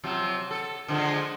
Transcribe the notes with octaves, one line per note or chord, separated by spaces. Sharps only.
C3 F3 F#3
A4
D3 F3 G#3